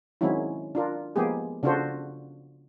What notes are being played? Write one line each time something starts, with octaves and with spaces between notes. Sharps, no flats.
D#3 F#3 G#3 C4 C#4 E4
D4 F4 A#4
F3 G#3 A#3 B3 G4 G#4
C#3 D4 F4 F#4 A4 C5